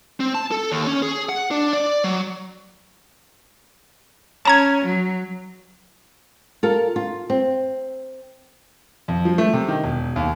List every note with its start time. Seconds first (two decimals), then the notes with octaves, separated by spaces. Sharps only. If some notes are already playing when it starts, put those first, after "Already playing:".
0.20 C4
0.35 A5
0.51 A4
0.72 D#2
0.87 C#4
1.02 G#4
1.29 F#5
1.51 D4
1.73 D5
2.04 F#3
4.45 C#4 A5 A#5 G#6
4.85 F#3
6.63 F4 A4 A#4
6.96 F4
7.30 C4
9.08 F2
9.25 F3
9.38 A3
9.53 C3
9.68 D#3
9.84 E1
10.16 D#2